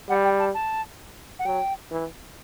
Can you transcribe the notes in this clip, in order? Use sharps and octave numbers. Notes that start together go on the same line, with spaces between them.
G3 F#5
G5
A5
A5
F#5
F#3 G5
E3